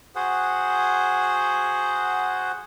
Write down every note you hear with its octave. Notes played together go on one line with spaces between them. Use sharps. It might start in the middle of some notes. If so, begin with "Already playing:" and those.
F#4 G#4 C5 F#5